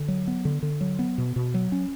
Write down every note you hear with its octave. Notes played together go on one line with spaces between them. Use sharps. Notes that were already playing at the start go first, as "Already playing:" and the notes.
Already playing: D3
F#3
B3
D3
D3
F#3
B3
B2
B2
F#3
C#4